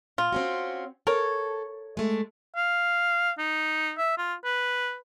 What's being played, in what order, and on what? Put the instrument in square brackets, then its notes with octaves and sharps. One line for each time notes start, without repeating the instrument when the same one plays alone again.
[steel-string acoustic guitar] A#2 [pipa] F4
[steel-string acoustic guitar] C4 C#4 F#4
[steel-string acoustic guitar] A4 [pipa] A#4 C#5
[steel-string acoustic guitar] G#3 A3
[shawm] F5
D#4
E5
F4
B4